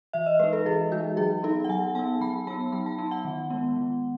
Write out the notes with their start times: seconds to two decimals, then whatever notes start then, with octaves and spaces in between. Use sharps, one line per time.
0.13 E3 E5
0.26 D#5
0.40 G#3 D#4 B4
0.53 A4
0.65 E3 G#4
0.92 G#3 D#4 F#4
1.17 F#3 G#4
1.43 B3 D#4 A4
1.64 F#5
1.69 F#3 G#5
1.95 B3 D#4 A5
2.21 F#3 B5
2.47 B3 D#4 A5
2.72 F#3 B5
2.86 A5
2.98 B3 D#4
3.11 F#5
3.25 D#3
3.50 G#3 B3
3.76 D#3